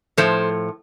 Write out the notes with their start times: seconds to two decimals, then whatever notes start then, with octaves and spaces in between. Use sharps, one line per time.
0.18 A2 F3 A4 C5